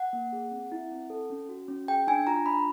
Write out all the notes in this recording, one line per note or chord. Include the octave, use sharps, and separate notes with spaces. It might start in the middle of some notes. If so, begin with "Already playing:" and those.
Already playing: F#5
A#3
G#4
C4
E4
C4
A4
C#4
F#4
C#4
G#4 G5
D4 G#5
F4 A#5
D4 B5